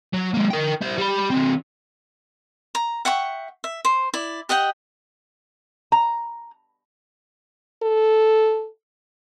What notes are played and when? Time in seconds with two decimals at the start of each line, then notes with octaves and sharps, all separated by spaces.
0.14 F#3
0.34 G#3 A#3
0.50 A#4 G5
0.82 E4 C5
0.98 G3 B5
1.30 D3 C4
2.75 A#5
3.05 E5 F#5 G5 C#6
3.64 E5
3.85 C5
4.14 E4 D5
4.49 G4 D#5 F#5 G5
5.92 A#5
7.83 A4